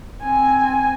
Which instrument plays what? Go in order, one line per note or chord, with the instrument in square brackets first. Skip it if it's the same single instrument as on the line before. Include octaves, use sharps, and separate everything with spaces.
[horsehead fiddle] C4 G#5